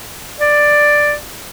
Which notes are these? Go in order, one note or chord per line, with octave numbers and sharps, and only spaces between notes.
D5